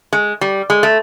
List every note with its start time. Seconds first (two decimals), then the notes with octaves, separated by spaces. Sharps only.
0.13 G#3
0.41 G3
0.70 G#3
0.83 A3